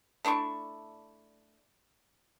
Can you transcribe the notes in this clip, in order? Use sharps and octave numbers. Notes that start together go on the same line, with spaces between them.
A3 D4 E4 C#6